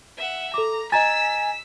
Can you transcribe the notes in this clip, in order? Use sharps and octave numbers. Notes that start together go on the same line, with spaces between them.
E5 F#5
A4 A#5 D6
D#5 G#5 A#5 E6 A6 B6